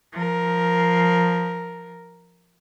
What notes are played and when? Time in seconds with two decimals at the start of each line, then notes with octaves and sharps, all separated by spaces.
0.12 F3 A#4